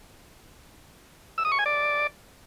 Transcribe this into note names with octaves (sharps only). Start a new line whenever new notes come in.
E6
D#6
C#6
G#5
D5